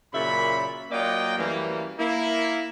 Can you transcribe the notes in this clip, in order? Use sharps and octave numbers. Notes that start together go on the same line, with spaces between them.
F#2 A#2 C#3 E5 B5
F#3 A#3 F4 D5 D#5 G5
F#2 E3 G3 A3 A#3
A#3 E4